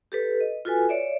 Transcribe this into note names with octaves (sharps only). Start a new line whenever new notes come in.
G4 A4 B4
D#5
F4 F#4 A4 B4 G#5
C#5 D5 E5